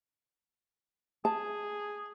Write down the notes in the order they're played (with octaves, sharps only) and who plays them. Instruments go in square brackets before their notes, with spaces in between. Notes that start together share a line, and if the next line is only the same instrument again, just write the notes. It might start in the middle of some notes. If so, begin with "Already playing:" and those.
[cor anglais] G#4 [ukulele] A5